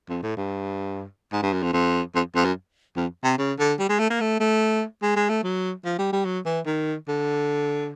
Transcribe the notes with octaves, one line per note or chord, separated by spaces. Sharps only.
F2
A2
G2
G#2
G2
F#2
F2
F2
F2
F2
F#2
F2
C3
C#3
D3
G3
G#3
A3
A#3
A3
A3
G#3
G#3
A3
F#3
F3
G3
G3
F#3
E3
D#3
D3